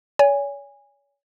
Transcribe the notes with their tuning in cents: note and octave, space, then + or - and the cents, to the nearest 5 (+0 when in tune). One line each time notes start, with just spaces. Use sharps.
C#5 +35 G#5 -20